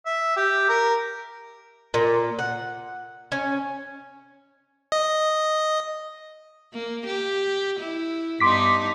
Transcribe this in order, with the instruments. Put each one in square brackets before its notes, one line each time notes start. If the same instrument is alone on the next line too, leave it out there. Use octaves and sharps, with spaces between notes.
[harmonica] E5
G4
A#4
[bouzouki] A#2
F#5
C#4
[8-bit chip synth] D#5
[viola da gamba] A#3
G4
E4
[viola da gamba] G2 B3 D#4 [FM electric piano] C6 D6 B6